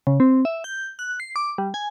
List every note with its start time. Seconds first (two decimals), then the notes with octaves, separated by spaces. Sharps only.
0.07 C#3
0.20 C4
0.45 E5
0.64 G6
0.99 F#6
1.20 C7
1.36 D6
1.58 G3
1.74 G#5